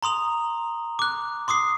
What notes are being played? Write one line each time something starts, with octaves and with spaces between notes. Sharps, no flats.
A#5 C6 D#6 F7
D6 F#6
C6 D6 D#6 C7